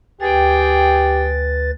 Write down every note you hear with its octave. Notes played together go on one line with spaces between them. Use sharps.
D2 G4 G#4 B4 G5 A6